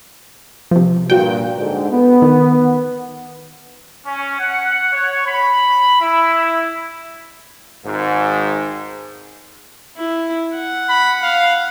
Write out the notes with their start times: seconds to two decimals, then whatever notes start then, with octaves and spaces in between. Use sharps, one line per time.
0.71 C3 F3
1.10 G2 A#2 F#4 G5
1.57 G#2 D3
1.90 B3
2.22 D#3
4.06 C#4
4.40 F#5
4.93 C#5
5.27 B5
6.01 E4
7.85 G#1 G#2
9.97 E4
10.55 F#5
10.89 B5
11.23 F5